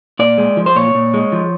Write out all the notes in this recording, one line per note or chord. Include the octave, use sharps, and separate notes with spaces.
A#2 D5
G#3
F3
C5
A#2 C#5
A#2
G#3
F3